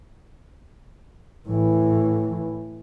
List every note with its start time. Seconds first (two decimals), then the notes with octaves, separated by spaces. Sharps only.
1.46 A2 E3